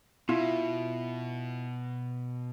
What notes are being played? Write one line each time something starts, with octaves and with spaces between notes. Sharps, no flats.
B2 E4 F4 E5